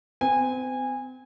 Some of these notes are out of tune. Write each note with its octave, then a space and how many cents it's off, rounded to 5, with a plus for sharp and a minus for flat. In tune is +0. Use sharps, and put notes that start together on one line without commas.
C4 -40 G#5 -20